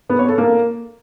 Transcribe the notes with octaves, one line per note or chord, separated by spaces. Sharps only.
B3
C#5
A4
A#3